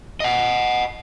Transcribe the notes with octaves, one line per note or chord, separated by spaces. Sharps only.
D#5 F#5